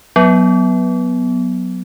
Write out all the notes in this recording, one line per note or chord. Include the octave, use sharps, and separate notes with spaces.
F#3 B3